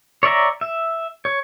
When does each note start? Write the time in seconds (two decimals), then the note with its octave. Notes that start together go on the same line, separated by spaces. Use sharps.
0.23 C#5 D5 E5 A#5
0.61 E5
1.25 C#5